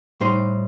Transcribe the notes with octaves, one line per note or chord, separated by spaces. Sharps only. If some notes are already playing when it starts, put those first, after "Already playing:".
A2 G3 D#4 C5